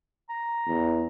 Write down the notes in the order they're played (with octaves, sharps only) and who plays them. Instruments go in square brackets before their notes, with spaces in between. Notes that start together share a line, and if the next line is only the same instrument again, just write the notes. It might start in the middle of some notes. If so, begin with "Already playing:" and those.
[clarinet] A#5
[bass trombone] E2